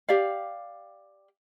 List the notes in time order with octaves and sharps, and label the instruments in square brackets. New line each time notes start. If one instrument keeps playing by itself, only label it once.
[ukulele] G4 D5 F5